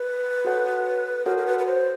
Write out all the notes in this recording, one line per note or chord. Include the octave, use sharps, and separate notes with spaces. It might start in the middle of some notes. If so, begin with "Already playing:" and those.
Already playing: B4
F#4 A4 C#5 F#5
F#4 A4 A#4 C#5 F#5
A#4
B4
B4
C5